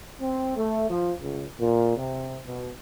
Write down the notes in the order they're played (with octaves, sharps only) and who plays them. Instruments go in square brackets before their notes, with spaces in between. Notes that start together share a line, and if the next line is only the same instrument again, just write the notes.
[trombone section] C4
A3
F3
C#2
A#2
C3
B2